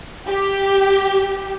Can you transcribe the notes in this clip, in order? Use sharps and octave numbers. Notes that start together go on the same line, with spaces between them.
G4